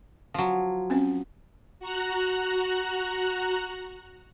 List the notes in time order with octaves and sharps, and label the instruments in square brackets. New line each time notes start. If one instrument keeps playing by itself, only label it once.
[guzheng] F3 F#3
[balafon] C4 C#4
[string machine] F#4 A#5 F#6